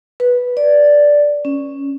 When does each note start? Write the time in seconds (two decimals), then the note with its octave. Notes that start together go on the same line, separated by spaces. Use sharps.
0.20 B4
0.57 D5
1.45 C#4